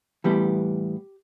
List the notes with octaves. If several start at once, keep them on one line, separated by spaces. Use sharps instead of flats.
A2 E3 G3 B3 G4